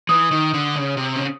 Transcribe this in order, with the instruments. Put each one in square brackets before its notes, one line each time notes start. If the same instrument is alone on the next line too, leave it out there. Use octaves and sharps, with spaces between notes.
[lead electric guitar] E3 [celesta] D#6
[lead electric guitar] D#3
D3
C#3
C3
C#3